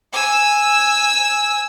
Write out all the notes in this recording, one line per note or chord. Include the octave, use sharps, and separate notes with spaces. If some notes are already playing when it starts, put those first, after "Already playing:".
G#5 E6